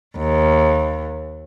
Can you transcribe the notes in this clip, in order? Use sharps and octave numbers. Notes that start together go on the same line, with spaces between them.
D#2